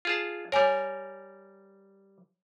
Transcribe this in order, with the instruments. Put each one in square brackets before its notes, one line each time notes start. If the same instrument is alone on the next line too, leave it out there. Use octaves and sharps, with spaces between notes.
[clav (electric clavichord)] F4 G#4 A5
[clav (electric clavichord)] G3 A#4 [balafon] C#5 G#5